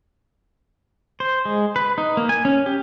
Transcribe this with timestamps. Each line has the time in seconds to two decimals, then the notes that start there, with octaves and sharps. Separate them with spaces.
1.20 C5
1.45 G#3
1.76 B4
1.98 D#4
2.17 A#3
2.29 G#5
2.45 C#4
2.66 G4